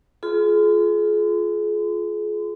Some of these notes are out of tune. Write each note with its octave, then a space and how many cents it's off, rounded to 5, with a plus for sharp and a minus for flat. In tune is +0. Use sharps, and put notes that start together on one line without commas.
F4 +5 G#4 +35 C6 -35